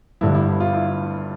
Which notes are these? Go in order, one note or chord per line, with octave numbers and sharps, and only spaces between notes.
G1 G2 D3 E4
E4
E4
F4
E4